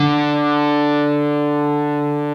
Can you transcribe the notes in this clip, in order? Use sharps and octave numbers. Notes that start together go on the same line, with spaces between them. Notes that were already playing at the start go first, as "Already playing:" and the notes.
Already playing: D3